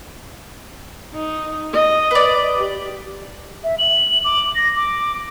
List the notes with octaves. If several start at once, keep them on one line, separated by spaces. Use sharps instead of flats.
D#4
D#5
B4 D5
G4
E5
F#7
D6
A#6
D6